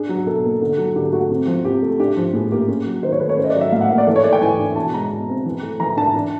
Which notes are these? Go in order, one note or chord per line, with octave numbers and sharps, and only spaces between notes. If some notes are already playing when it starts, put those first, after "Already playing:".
Already playing: D4 G#4
F#3
B2 A4
A#3
D3 A4
F#3
D3 G4
A3 F#4
C3
F3
C3 G4
A3
D4 G4
F3
A2 G#4
A#3 G4
C#4 G#4
F#3
D#3 C5
C#5
A3 B4
C#5
C#4 C5
D#5
D5
F#3
E5
A2 F5
F#5
A#3 E5
D5
E3 A4
C#5
A3 D5
G5
E3 G#5
D4
B2 A5
G#3 A#5
B2
C4
E3
A3
E3 A#5
D4 A5
D4